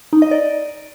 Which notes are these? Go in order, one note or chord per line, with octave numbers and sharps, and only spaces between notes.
D#4
D#5
D5